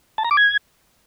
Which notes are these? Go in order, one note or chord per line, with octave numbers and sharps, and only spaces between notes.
A5
A#5
D6
G#6